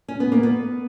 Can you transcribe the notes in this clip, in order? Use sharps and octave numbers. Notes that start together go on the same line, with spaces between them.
C#4
B3
A#3
B3